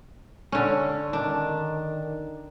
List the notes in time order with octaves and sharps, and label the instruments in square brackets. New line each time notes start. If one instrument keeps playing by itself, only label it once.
[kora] D3 C#4
[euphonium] D#3 [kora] D4